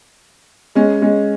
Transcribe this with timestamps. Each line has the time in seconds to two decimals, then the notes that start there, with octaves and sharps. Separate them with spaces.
0.75 G#3 C#4
1.02 G#3 C#4